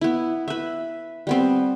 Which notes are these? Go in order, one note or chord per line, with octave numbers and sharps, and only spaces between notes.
B3 E4
B4 E5
G3 B3 C4